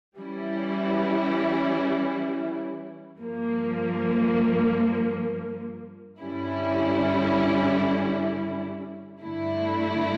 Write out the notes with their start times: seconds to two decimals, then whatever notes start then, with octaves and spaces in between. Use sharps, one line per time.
0.17 E3 G3 C#4 E4
3.18 G2 F3 A#3
6.20 G2 D3 G3 C#4 E4
9.21 G2 D3 A3 E4